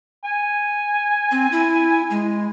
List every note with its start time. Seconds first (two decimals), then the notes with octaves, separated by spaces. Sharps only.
0.24 G#5
1.31 C4
1.52 E4
2.10 G#3